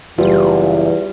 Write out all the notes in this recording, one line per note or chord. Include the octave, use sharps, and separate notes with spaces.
F#1 E2 E3 G3 F4